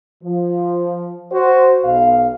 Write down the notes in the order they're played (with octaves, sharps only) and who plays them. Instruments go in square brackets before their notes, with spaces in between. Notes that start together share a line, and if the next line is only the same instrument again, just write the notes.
[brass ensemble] F3
F#4 C5
B1 B2 F5